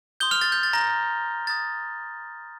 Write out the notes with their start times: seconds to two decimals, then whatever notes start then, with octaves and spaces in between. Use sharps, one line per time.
0.20 C6 D#6 G6 G7
0.31 F6 F7
0.41 A6
0.52 G6
0.63 A6
0.73 A#5 A#6
1.47 A#5 D#6 G6 A6